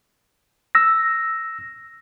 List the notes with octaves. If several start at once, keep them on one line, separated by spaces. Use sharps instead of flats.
E6 A#6